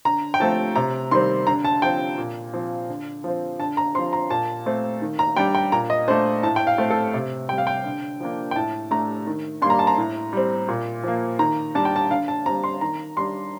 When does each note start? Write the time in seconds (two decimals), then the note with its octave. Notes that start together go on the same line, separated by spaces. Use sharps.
0.05 D3 A#5
0.34 G5
0.40 F3 A3 C4 A5
0.76 C3 A#5
1.11 D#3 G3 C4 C6
1.47 D3 A#5
1.65 A5
1.82 F3 C4 G5
2.18 A#2
2.53 F3 C4
2.89 D3
3.24 F3 C4
3.59 D3 A5
3.77 A#5
3.95 C4 C6
3.98 F3
4.13 A#5
4.30 A#2 A5
4.66 A3 C4
5.02 D#3
5.19 A#5
5.37 G3 D4 G5
5.55 G5
5.72 A#2 A#5
5.90 D#5
6.08 A3 D4 C5
6.43 A2 A5
6.56 G5
6.67 F5
6.78 A3 C4
6.90 A4
7.14 C3
7.49 G3 C4 G5
7.58 F5
7.67 G5
7.85 D3
8.20 F3 A#3 D4
8.51 G5
8.55 A2 A5
8.91 A3 D4 A#5
9.27 D#3
9.62 G3 A#3 D4 C6
9.70 A#5
9.79 A5
9.87 A#5
9.98 A2
10.33 G3 C4
10.68 A#2
11.04 F3 A#3
11.39 D#3 A#5
11.75 G3 D4 A5
11.85 G5
11.96 A5
12.10 D3 F5
12.28 A5
12.46 C4 A#5
12.49 G3
12.64 C6
12.81 D#3 A#5
13.16 G3 D4 C6